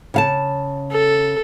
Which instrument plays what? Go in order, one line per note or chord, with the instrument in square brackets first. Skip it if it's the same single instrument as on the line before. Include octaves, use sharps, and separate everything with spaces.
[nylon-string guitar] C#3 F5 A5
[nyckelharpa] A4